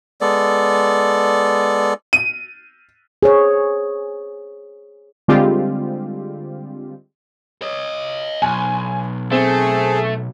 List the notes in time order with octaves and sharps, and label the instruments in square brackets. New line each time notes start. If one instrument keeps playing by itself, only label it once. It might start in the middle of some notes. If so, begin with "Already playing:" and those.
[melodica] G#3 B3 A4 D5
[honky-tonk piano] D#7
[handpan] G#4 C5 C#5
[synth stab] D3 G3 G#3 C4 F4 G4
[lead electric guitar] C#5 D#5
[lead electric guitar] B1 [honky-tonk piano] G#5
[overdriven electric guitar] A3 [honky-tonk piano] C4 [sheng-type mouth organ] G#4